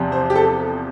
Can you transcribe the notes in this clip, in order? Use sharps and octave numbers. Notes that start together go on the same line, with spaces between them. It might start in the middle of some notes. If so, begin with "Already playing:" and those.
Already playing: E2 C3 F3
C5
G4
A4